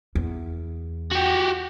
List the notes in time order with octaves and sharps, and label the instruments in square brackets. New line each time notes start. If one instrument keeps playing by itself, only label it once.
[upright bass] E2
[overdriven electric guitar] F#4 G4